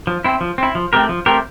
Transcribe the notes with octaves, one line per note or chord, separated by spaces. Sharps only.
F3
C4 E4
F3
C4 E4
F3
A3 C4 G4 A#4
F3
A3 C4 G4 A#4